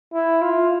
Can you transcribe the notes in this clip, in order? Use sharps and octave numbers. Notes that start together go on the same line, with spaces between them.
E4
F4